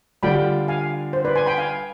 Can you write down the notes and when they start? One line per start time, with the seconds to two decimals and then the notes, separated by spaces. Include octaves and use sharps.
0.23 D3 G3 D4 F4 G5 B5
0.68 F5 G#5
1.13 C5
1.25 B4 D5
1.36 G#5 C6
1.46 G5 B5
1.58 F5 G#5